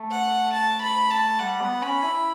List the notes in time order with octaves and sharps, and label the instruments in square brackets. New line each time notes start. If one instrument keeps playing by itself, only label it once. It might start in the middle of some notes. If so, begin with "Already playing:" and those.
Already playing: [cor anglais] A3
[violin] F#5
A5
B5
A5
[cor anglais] G3 [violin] F#5
[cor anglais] B3
[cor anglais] C#4 [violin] B5
[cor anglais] E4